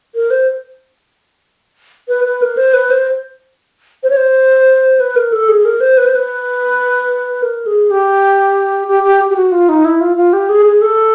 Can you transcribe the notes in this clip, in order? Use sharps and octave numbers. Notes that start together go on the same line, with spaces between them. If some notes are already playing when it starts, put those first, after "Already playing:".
A#4
C5
B4
B4
A#4
C5
B4
C5
C5
C#5
C5
B4
A#4
A4
G#4
A#4
C5
B4
C5
B4
A#4
G#4
G4
G4
G4
G4
F#4
F4
D#4
E4
F4
F4
G4
G#4
G#4
A4